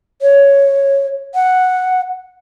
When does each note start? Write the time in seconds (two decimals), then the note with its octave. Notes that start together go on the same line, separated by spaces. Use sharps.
0.22 C#5
1.35 F#5